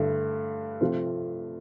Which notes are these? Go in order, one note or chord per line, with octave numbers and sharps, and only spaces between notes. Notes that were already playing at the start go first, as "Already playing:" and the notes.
Already playing: G2 D3 A3 E4
C3 F3 A3 C4 F4